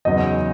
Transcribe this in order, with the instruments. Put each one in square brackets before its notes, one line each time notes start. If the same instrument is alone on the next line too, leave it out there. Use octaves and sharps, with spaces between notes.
[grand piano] E2 C#3 F#3 D#4 D#5